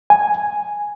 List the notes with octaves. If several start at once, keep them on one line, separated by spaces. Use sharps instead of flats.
G#5